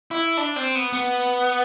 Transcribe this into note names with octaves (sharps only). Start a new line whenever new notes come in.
E4
D4
C4
B3
B3